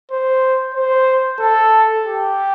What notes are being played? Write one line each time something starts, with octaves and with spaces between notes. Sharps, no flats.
C5
C5
A4
G4